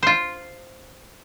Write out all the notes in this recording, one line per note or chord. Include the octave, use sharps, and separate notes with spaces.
F4 C5